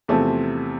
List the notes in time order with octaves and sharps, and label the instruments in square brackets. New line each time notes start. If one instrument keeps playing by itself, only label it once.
[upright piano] E2 C3 F3 A3 C4